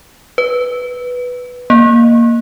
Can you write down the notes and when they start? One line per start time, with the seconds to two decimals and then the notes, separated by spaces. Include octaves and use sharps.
0.38 B4
1.70 A#3